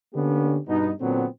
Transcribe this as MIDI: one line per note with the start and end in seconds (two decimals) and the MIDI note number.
0.14 0.58 50
0.14 0.58 58
0.14 0.58 59
0.14 0.58 61
0.14 0.58 62
0.14 0.58 67
0.68 0.90 43
0.68 0.90 47
0.68 0.90 59
0.68 0.90 63
1.01 1.26 46
1.01 1.26 50
1.01 1.26 54
1.01 1.26 59
1.01 1.26 60